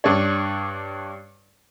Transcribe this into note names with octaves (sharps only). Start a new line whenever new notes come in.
G2 D4 C#5